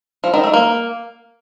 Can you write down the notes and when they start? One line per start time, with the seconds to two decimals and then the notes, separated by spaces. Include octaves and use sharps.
0.24 F3
0.34 D#3
0.44 A3
0.54 A#3